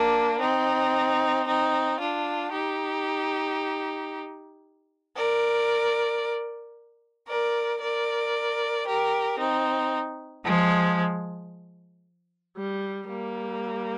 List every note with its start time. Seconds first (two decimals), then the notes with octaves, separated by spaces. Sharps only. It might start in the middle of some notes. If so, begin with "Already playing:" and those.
Already playing: A#3 D4
0.40 C4 D#4
1.47 C4 D#4
1.99 D4 F4
2.52 D#4 G4
5.15 A#4 D5
7.27 A#4 D5
7.80 A#4 D5
8.86 G4 A#4
9.38 C4 D#4
10.44 F3 G#3
12.55 G3
13.08 G3 A#3